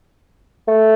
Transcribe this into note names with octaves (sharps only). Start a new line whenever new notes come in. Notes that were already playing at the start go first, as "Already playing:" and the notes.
A3